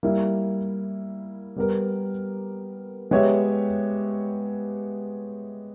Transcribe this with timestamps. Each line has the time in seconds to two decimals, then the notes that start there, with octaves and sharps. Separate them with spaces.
0.03 G3 A#3 E4
1.56 G3 B3 G4 A#4
3.11 G#3 B3 G4 C#5 E5